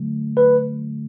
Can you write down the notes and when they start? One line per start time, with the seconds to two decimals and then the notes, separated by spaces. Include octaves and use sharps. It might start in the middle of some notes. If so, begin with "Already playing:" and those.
Already playing: D3 F#3 A3
0.37 B4